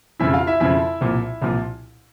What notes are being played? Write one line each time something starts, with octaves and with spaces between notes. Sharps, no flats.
F2 C#3 F3 E4 E5
F4 F5
E4 E5
F2 C#3 F3 E4 E5
C2 A#2 F3
C2 A#2 F3